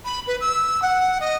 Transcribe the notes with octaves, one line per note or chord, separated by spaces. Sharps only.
B5
B4
E6
F#5
D#5